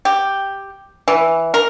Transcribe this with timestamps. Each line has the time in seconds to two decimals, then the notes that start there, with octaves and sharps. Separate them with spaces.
0.05 G4
1.08 E3
1.54 A#4